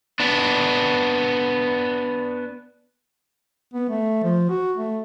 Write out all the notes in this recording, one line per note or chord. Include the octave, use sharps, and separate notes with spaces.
B3 D4
B3
A3
F3
F#4
A3